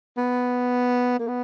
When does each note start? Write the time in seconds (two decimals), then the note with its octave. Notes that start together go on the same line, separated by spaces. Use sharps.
0.17 B3
1.19 A#3
1.28 B3